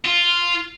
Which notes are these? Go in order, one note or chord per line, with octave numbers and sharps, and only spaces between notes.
F4